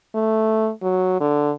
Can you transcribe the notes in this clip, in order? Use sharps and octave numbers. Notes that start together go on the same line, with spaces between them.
A3
F#3
D3